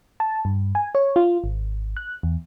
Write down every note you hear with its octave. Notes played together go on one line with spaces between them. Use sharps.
A5
G2
G#5
C#5
F4
G#1
F#6
E2